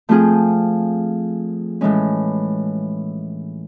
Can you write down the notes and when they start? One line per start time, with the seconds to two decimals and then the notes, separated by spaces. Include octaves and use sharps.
0.09 F3 A3 C4 F4 G#4
1.81 A2 E3 G#3 C#4